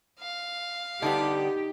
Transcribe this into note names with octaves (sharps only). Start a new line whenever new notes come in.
F5
D3 G3 B3 D#4 G4